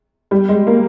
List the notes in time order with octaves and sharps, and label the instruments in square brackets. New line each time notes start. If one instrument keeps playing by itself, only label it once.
[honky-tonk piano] G3
G#3
A#3